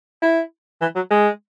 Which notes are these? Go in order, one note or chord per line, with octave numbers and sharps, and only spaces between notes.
E4
E3
F#3
G#3